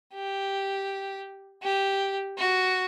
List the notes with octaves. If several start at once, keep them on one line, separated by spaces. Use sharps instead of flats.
G4
G4
F#4